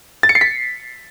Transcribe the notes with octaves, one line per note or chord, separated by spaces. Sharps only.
A6
C#7
C7
B6